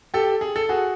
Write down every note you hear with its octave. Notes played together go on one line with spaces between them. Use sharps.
G4 A4
G#4
A4
F#4 G#4